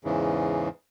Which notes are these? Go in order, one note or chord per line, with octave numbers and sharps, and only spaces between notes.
E2 G#2 C#3 E3